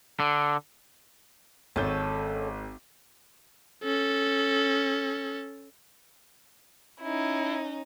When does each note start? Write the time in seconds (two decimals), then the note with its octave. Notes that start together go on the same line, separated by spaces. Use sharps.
0.20 D3
1.76 G#1 C#4 A4 G6
3.84 C#4 A4
7.02 C#4 D#4 E4